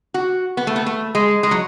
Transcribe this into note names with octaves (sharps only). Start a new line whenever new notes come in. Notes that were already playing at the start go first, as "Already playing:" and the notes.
F#4
B3
A3
B3
A3
G#3
G#3
F#3